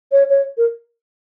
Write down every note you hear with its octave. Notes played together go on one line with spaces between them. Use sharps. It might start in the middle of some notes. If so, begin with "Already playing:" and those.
C#5
C#5
A#4